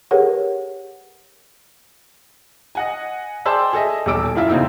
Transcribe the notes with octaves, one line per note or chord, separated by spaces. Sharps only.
G4 G#4 A#4 B4 C#5 F#5
D#5 F#5 G#5
G#4 C5 D5 G5 A5 E6
G#4 A4 D#5 E5
D#1 B1 A4 D6 E6 D7
F#2 E4 F4 E5
E2 C#3 C4 D#4 E6